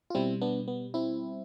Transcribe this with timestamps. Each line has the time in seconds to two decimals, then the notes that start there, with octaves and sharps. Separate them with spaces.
0.10 F4
0.15 B2 G3 C4 E4
0.41 B3 D4
0.68 B3
0.94 C4 E4